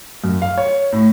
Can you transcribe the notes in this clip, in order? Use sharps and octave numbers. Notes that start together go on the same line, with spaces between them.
F#2
F5
C#5
A2